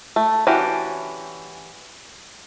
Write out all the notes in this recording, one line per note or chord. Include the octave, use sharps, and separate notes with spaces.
A3
E3 C#4 D4 F#4 G4